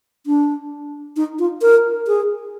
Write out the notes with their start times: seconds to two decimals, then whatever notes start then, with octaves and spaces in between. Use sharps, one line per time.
0.26 D4
1.16 D#4
1.39 F4
1.62 A#4
2.07 G#4